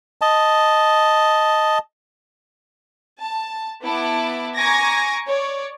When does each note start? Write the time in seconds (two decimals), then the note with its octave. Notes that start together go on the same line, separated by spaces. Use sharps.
0.21 D#5 A5
3.22 A5
3.84 B3 E4 A5 D6
4.57 G#5 A#5 C#6 D6 G#6 A#6
5.28 C#5 D5